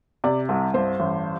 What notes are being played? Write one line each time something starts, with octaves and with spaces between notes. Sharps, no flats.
C3 D5
C2
G2 C5
A1